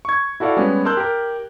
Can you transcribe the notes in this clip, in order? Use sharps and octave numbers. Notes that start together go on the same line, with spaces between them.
C#6 G#6
E4 F#4 A4 D5 F5
G3 G#3 B3 C#4
A#4 A5 C6 E6 F#6 G6
G4 A#4